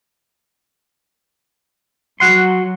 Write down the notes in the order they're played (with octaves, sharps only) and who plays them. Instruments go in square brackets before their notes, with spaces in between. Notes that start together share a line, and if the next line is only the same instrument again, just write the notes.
[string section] F#3 [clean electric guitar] F#4 F#5 C6